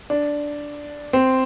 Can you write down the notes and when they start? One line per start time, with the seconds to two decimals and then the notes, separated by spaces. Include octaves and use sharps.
0.10 D4
1.13 C4